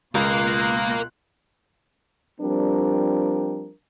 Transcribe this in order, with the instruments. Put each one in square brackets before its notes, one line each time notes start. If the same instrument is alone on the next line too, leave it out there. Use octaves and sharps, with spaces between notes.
[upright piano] C#2 [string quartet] B2 F4 F#6 [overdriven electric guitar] A#4 F5
[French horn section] F3 G3 C4 D4 A#4